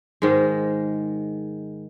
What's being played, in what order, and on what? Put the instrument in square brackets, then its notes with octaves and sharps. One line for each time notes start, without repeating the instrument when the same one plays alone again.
[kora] G#2 D#3 G#3